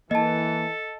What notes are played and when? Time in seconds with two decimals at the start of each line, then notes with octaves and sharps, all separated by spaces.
0.11 E3 A#3 A4 D#5 A5